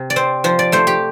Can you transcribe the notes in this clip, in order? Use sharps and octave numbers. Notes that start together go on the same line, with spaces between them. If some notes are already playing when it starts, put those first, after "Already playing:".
Already playing: C3
D5
C4 C5
F3 C5
D5
A3 C5
G4